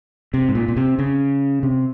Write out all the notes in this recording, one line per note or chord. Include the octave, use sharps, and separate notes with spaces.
C3
G#2
A#2
A#2
C3
C#3
C3